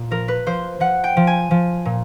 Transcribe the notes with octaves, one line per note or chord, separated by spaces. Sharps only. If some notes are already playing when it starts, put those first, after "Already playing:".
Already playing: A#2
F3 A#4
B4
F3 C5
F3 F#5
G5
F3
G#5
F3
A#2